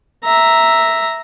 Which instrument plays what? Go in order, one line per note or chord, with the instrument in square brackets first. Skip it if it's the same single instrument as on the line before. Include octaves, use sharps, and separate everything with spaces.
[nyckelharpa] E5 A#5